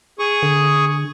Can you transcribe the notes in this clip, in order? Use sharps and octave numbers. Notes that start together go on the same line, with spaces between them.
G#4 C#6 D#6
D3